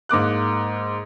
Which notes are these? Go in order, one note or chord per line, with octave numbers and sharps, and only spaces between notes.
G#2 A#3 D6 F#6